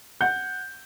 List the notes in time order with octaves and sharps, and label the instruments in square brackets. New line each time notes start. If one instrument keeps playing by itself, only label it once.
[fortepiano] F#5 [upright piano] G6